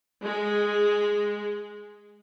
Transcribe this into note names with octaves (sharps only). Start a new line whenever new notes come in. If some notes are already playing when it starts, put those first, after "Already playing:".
G#3